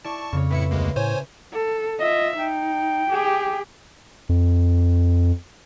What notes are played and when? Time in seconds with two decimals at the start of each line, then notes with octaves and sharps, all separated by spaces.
0.05 E4 D5 A5 C#6
0.33 F2 C#3 C#5
0.51 A2 E4 B4 E5 C#7
0.71 D2 G#3 A#3
0.96 A2 C5 C#5 G#5
1.53 A4
2.00 F4 D#5 E5
2.39 D#4 G5
3.10 G4 G#4
4.29 F2